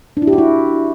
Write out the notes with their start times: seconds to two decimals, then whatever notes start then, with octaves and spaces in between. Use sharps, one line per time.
0.17 D4
0.22 E4
0.27 G4
0.33 F#4
0.38 E4